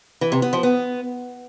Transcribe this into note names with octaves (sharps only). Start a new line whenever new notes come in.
E3
C3
B3
F3
B3